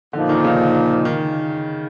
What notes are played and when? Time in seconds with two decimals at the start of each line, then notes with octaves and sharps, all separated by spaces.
0.13 A#2 D3 F3 A#3 D#4
0.29 D#3
0.44 C#3
1.05 D#3